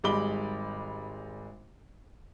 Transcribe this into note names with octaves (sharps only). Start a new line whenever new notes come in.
G#1 G3 G#3 B5 D6 G7